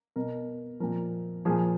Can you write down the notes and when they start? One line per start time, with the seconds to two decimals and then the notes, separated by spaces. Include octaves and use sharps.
0.16 B2 A#4
0.80 A#2 F3 A#4
1.45 A#2 F3 G#4